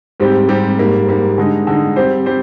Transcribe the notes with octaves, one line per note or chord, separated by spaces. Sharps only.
G#2 G3 C4 G4
G#2 G3 C4 G4
G#2 G3 A#3
G#2 G3 A#3
D3 G#3 D#4
D3 G#3 D#4
G3 C4 G4 C5
G3 C4 G4 C5